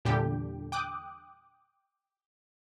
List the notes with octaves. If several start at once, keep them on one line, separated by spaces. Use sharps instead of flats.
E2 A#2 D3 G3 G4 G5
G5 D6 D#6 F#6